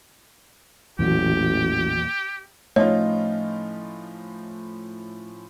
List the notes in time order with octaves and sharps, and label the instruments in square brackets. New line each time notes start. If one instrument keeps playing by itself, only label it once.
[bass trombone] A1 [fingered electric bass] E2 A#2 F#3 [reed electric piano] E3 F#4 [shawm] G4
[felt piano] A2 F3 C#4 [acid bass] A3 [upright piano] D#4 F4 [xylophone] C#5